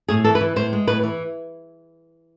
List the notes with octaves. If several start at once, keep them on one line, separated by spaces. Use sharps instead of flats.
A2 G#4
E3 A4
B4
E3
A2 C5
G#3
A2 B4
E3